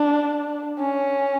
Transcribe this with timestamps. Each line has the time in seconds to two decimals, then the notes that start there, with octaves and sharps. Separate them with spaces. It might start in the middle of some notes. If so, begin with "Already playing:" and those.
Already playing: D4
0.81 C#4